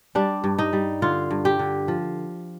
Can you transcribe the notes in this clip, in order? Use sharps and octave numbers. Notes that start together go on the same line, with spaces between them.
G3 D4
G2
D#4
G3
D3 F4
G2
G4
D3
F3